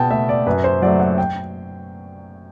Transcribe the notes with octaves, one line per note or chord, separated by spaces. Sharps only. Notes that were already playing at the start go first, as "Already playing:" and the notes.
Already playing: B2 G5 A5
A3 E5
D5
F#2 B4
C5
F#3 A3 D5
F#5
G5